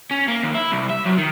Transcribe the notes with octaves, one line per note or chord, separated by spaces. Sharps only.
C#4
A#3
D#2
E4
C2
E5
F#2
D#3